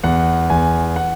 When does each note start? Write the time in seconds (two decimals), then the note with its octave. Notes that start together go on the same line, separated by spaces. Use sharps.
0.04 E2 F#5
0.50 E2 G#5
0.96 F#5